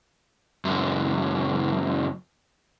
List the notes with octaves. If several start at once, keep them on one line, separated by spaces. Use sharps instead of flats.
C#2 F#2